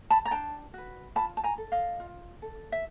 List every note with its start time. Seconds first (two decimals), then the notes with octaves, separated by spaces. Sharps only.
0.10 A5 B5
0.25 A#5
0.31 D4 G5 A5
0.74 F#4 B4
1.15 F4 A5 B5
1.37 A5
1.44 G#5 A#5
1.58 A4
1.72 D#5 F5
2.00 F4
2.42 A4
2.72 E5